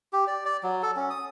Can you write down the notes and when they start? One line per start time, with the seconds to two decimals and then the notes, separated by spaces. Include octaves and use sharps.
0.13 G4
0.27 D5
0.45 D5
0.63 F#3
0.83 A4
0.96 C#4
1.10 D#6